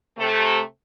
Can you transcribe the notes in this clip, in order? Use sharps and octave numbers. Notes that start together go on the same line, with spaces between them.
C3 A3